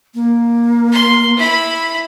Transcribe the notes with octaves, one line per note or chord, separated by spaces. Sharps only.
A#3
C6
E4 B5